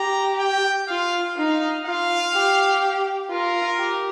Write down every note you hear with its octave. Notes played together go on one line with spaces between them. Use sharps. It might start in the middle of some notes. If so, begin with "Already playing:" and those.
Already playing: G4 A#5
G5
F4 F5
D#4 F5
F4 F5
G4
F4 A#4
G4